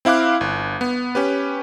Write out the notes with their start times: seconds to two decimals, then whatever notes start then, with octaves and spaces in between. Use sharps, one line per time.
0.05 C4 E4 F5 D6 F#6
0.41 G1
0.81 B3
1.15 C#4 G4 B4